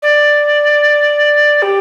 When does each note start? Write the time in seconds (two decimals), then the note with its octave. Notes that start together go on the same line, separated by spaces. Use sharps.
0.02 D5
1.62 G4